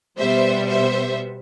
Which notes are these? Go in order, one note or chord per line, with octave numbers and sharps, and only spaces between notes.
B2 G3 B3 C5 E5
C5 E5